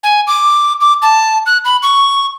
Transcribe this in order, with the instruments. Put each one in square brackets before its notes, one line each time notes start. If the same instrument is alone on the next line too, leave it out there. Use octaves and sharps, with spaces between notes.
[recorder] G#5
D6
D6
A5
F#6
B5
C#6